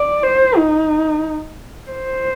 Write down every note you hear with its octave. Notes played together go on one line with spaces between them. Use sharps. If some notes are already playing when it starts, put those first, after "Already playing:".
Already playing: D5
C5
D#4
C5